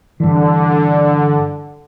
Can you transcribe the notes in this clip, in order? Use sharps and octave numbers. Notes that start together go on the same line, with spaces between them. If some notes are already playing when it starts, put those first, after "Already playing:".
G2 D3 E3